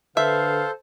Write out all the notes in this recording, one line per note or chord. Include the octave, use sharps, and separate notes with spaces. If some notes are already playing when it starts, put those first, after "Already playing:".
D3 A4 B4 C5 E5 F5